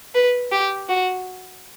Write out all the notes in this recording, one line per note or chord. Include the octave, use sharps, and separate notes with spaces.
B4
G4
F#4